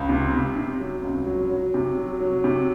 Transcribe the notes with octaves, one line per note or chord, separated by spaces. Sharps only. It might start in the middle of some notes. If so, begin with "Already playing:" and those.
Already playing: C#2
C3
C3
C3
F#3
C#2
F#3
F#3
C3
F#3
F#3
C3